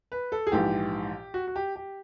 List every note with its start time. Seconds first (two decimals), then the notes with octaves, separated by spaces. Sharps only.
0.12 B4
0.32 A4
0.47 G#4
0.52 A#1 G#2 E3 G4
1.34 F#4
1.48 F#4
1.56 G4
1.76 G4